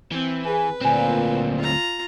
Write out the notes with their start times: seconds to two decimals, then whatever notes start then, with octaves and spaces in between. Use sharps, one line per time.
0.12 E3 C4
0.46 G#4 B4 G#5
0.81 D2 A#2 C4 C5 G#5
1.58 F4 A#5